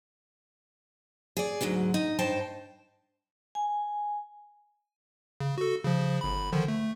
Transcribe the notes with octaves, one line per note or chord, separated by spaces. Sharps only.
G#4 D5
D2 G#2 F#3 G#3
D#4
G2 D#4 C5 G5 A5
G#5
C#3
F#4 A4
C#3 F3
G1 B5
D3 D#3 F3
A3